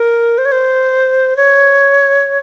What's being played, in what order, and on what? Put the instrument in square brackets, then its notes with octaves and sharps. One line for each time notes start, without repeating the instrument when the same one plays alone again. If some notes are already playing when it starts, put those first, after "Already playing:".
Already playing: [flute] A#4
C5
C#5
C5
C#5